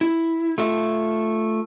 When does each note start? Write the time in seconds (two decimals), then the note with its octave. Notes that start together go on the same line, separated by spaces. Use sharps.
0.01 E4
0.58 A3 F4 E5